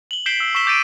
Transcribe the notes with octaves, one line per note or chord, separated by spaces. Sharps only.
F#7 G7
G6 B6 C7 D7 E7 G7
E6
C#6 E6 B6 E7 G7
D6 G6 A6 D7 D#7